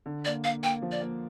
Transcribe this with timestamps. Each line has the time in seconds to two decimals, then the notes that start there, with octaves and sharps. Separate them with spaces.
0.06 D3
0.25 A#3 D5
0.44 A#3 F5
0.63 A#3 G5
0.82 F3
0.92 D5
1.01 A#3